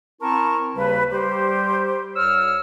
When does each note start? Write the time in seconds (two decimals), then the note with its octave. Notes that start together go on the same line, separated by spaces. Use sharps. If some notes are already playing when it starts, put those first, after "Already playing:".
0.22 C4 E4 A#4 A5 A#5 C#6
0.76 D#2 C#3 G3 B4
1.11 G3 G4 C5
2.16 C2 C#5 E6 F6